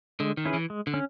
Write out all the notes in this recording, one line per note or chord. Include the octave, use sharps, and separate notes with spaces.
D3 G#3
D#3
C#4 E4 G#4 B4
E3
G#3
D3
C#4